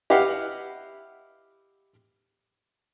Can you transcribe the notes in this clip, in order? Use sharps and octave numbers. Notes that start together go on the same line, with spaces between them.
E4 G4 B4 D#5 F5 F#5